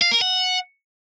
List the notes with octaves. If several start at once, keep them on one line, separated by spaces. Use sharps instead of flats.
F5
A#4
F#5